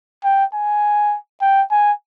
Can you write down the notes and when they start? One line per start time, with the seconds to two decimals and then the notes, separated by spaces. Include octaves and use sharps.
0.24 G5
0.54 G#5
1.41 G5
1.71 G#5